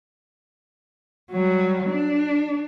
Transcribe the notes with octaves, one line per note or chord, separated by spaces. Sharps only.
F#3 G3
D4